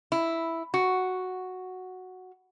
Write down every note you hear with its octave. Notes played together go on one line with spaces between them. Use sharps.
E4
F#4